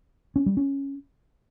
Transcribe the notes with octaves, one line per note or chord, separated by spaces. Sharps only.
C#4
G3
C#4